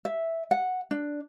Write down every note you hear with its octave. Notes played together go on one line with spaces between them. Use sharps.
E5
F#5
D4